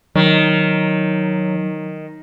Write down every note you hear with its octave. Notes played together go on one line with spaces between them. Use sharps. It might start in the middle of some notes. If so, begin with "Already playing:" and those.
D#3 F#3